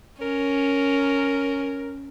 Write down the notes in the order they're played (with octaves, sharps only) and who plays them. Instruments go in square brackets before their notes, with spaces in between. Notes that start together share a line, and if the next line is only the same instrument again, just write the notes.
[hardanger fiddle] C#4 [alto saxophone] A#4